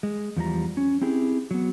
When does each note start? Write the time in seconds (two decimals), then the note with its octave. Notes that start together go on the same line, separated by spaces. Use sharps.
0.03 G#3
0.36 E2 F3 G3 A#5
0.77 C#4
1.01 C4 E4 G4 G#4
1.51 F#3 B3